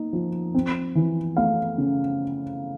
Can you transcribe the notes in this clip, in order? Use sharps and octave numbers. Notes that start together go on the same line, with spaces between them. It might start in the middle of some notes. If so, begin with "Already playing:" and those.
Already playing: A#3 D#4
F3
C4
E3
A3 F5
C#3